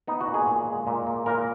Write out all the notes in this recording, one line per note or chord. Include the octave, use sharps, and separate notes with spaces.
B3 D#4
F#4
A#2
G#4
A#2
G#3
A#2
A#3
A#2 A#4